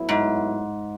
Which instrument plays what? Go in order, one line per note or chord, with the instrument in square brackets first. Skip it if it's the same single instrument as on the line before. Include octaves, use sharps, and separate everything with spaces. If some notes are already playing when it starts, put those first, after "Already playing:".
Already playing: [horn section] A2 F#3 B3 E4
[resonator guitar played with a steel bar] G#2